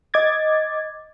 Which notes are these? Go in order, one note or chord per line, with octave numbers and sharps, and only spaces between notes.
D#5 D6 G#6 A6